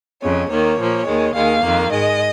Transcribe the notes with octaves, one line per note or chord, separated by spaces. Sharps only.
F2 C#3 G#3 C#5
D#2 D#3 A#3 C#5
A#2 F3 A#3
D#2 D#3 G#3
D#2 D#3 G#3 F5
F2 D#3 A#3
G#2 G#3 D#5